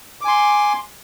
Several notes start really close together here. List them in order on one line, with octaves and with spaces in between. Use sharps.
D6 G#5 C6